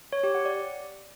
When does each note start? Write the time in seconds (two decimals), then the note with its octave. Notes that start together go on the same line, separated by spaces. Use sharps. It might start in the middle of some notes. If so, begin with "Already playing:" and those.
0.13 C#5
0.23 G4
0.34 F#5
0.45 D5